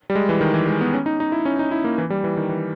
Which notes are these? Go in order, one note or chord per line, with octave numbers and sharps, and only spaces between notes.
G3
G#3
E3
D#3
E3
G#3
B3
C#4
D#4
D#4
E4
C#4
D#4
E4
A#3
E3
G3
E3
D#3
E3